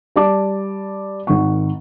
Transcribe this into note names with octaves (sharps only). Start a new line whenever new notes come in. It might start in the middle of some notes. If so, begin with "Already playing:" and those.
G3 D5 A5 D6
G#1 D#3 F#5 C#6